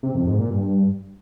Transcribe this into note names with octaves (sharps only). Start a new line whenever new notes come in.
C3
F2
G#2
A#2
G2